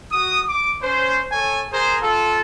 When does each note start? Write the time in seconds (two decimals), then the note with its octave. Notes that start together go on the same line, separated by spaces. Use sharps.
0.12 F#4 D#6
0.48 D6
0.83 C#4 C5
1.32 A4 C#5 G#5
1.72 G#4 A#4 C5
2.02 F4 A4